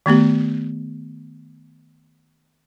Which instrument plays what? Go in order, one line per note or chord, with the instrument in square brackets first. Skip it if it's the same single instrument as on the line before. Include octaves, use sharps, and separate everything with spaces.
[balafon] D#3 A3 B3 G4